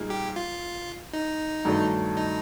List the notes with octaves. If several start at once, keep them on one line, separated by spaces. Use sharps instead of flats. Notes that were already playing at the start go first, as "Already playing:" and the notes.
Already playing: A#2 G3 A#3 D#4 G#4
G4
F4
D#4
G2 D#3 F#3 A3 D4
D#4